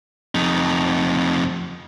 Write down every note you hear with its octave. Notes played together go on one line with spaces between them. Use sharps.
F2 D#4